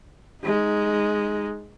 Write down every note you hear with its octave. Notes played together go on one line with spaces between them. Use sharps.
G#3 D#4